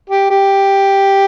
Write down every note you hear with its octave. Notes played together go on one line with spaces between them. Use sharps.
G4
G4